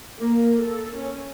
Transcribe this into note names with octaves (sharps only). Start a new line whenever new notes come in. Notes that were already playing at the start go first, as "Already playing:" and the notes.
A#3
A4
C#4